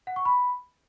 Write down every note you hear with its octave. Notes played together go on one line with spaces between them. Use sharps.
F#5
C#6
B5